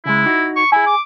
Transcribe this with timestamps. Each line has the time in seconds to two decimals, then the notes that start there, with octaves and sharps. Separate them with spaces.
0.05 C#3 G#3 E4
0.26 D#4 F#4
0.56 C#6
0.72 E4 G#4 G#5
0.87 D6